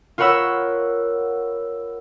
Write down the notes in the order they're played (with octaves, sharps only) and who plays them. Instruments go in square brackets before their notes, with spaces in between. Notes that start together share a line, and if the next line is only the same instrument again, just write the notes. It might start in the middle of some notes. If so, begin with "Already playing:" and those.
[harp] F4 A#4 C#5 F#5 B5 E6